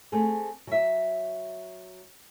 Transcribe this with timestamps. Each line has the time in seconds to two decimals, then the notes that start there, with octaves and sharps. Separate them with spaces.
0.12 A3 C4 G#4
0.67 F#3 E5